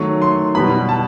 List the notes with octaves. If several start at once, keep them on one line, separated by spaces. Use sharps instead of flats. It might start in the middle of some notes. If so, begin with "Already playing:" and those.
Already playing: D#3 F#3 A3 C#6
C6
B2 G3 B3 B5
A5